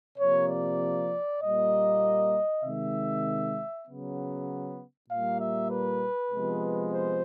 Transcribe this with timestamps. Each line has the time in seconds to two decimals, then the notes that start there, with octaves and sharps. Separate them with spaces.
0.19 C3 F3 A#3 C#5
0.49 D5
1.41 A#2 G3 A#3 D#5
2.64 C3 D#3 G#3 E5
3.87 C#3 F#3 B3
5.09 A#2 G3 A#3 F5
5.40 E5
5.71 B4
6.32 C3 F3 G#3 B3
6.94 C5